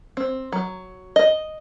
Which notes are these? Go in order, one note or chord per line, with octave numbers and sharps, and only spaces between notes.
C4
F#3
D#5